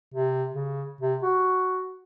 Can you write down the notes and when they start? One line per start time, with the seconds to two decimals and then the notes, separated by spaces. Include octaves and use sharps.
0.14 C3
0.54 C#3
1.01 C3
1.23 F#4